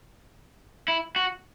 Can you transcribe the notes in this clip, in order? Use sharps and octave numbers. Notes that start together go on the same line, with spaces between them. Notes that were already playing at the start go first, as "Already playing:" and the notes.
E4
F#4